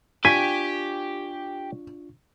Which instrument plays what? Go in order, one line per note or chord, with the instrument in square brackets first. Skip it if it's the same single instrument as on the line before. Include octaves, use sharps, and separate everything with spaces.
[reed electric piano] D4 F4 C#6 [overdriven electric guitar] G4 [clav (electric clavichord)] G#5 [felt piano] B6